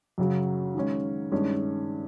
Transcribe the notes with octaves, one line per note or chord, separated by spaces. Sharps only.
F#2 C#3 F#3
D#3 G#3 C#4
G2 D#3 G#3 C#4